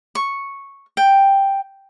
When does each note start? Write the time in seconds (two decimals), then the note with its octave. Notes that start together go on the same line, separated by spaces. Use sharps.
0.15 C#6
0.97 G5